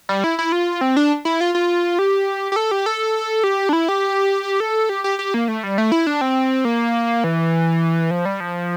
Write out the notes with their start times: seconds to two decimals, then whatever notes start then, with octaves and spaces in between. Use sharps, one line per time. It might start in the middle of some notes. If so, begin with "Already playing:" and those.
0.09 G3
0.24 E4
0.39 E4
0.52 F4
0.81 C4
0.97 D4
1.25 E4
1.41 F4
1.55 F4
1.99 G4
2.52 G4
2.56 A4
2.71 G4
2.86 A4
3.44 G4
3.69 D4
3.73 E4
3.89 G4
4.60 A4
4.89 G4
5.04 G4
5.19 G4
5.34 A#3
5.48 A3
5.63 G3
5.78 A3
5.92 E4
6.07 D4
6.21 C4
6.65 A#3
7.24 E3
8.11 F3
8.25 G3
8.40 F3